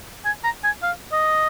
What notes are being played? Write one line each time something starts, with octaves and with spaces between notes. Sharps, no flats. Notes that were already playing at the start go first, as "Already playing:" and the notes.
G#5
A#5
G#5
F5
D#5